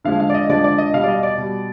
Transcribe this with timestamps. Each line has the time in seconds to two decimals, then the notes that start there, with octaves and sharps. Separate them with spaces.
0.05 D3 F3 G#3 F5
0.20 F5
0.30 D5
0.34 D#5
0.49 D3 F3 G#3 D5
0.64 D5
0.78 D#5
0.93 B2 G3 F5
1.03 D5
1.08 D#5
1.23 D5
1.38 B2 G3